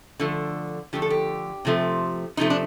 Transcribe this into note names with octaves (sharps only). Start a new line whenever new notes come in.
D3 F3 A3
D3 F3 A3 G4
A4
G4
C3 F3 A3
C3 F3 A3 D#4
D4